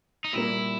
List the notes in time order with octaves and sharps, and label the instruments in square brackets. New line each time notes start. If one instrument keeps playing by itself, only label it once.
[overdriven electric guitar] D#4
[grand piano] A#2 G3 A#3 [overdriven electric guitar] E4